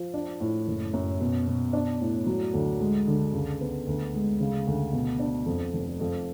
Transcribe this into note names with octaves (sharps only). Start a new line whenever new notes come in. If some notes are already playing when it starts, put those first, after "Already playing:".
Already playing: F3
D4
A2
F#1
F#2
B2
B2
D4
A2
F#3
D2
G#3
D3
C#2
B3
D2
G#3
C#3
D2
B2
D4
F2
F1
F2